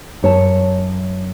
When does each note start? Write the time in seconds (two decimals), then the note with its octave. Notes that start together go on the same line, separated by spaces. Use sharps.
0.22 F#2 C#5 A5